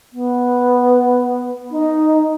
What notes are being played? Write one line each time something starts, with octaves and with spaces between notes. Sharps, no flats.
B3
D#4